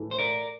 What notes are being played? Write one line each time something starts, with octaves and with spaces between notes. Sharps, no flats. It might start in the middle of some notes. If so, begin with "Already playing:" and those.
Already playing: A2 E3 A3 E4
C5
A#4 D5